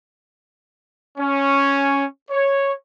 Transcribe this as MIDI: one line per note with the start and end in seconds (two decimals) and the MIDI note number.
1.18 2.04 61
2.30 2.72 73